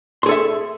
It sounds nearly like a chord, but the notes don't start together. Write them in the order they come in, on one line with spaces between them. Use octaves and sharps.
C6 G#4 A4 E5